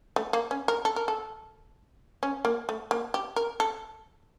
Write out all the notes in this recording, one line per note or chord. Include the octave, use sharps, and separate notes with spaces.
A3
A#3
C#4
A#4
A4
A#4
A4
C#4
A#3
A3
A#3
G4
A#4
A4